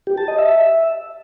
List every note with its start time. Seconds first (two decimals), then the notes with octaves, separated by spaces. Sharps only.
0.07 G4
0.17 A5
0.28 D#5
0.38 E5